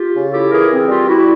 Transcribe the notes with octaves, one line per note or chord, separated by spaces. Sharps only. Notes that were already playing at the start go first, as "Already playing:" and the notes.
Already playing: F4 G4
C#3
E4 G4 A4
E3 G#4 A#4
C4
G3 F4 G4
E4 F#4